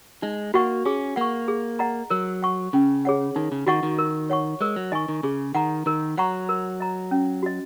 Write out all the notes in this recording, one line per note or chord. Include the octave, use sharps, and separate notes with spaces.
G#3 D#4
A#3 F#4 D#5 F#5 C#6
C#4 G#4
A#3 F#5 C#6
G#4
D#5 F#5 A#5
F#3 A#4
F#5 C#6
C#3 C#4
G#4 C#5 F#5
D#3 D#4
C#3
D#3 F#4 D#5 F#5 C#6
D#3
A#4
C#5 F#5 C#6
G#3 A#4
F#3
D#3 D#5 G#5 C#6
D#3
C#3 G#4
D#3 F#5 A#5
D#3 A#4
F#3 F#5 A#5 C#6
A#4
D#5 A#5
C#4
F#4 D#5